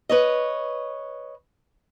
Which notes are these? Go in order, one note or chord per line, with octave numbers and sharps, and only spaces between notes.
B4 C#5 D#5